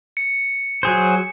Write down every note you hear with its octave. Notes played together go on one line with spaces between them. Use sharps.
C#7
F#3 G#4 C5